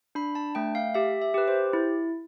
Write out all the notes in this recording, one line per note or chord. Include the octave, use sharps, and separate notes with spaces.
D4 B5
A5
A3 G5
F5
G4 E5
E5
G4 B4
C5
E4